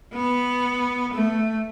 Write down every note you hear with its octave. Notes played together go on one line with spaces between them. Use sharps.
B3
A3